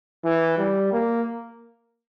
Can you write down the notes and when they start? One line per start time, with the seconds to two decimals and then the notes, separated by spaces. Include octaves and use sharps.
0.25 E3
0.58 G3
0.92 A#3